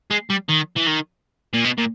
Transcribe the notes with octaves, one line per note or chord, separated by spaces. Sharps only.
G#3
G3
D#3
E3
D#3
A#2
B2
A#2